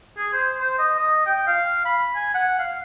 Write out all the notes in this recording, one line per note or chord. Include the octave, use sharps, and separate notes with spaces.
G#4
C5
C5
D#5
D#5
G5
F5
B5
G#5
F#5
F5